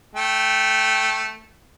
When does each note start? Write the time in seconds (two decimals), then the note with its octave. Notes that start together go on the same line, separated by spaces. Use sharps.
0.15 A3 G5